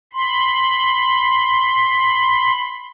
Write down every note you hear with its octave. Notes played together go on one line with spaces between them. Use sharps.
B5 C6